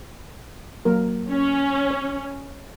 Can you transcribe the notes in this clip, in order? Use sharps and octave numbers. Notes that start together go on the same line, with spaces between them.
F#3 A#3 A#4
C#4
C#5